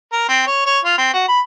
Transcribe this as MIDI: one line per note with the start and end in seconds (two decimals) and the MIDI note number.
0.12 0.28 70
0.28 0.44 60
0.46 0.63 73
0.66 0.79 73
0.85 0.96 65
0.98 1.10 60
1.13 1.23 66
1.28 1.40 83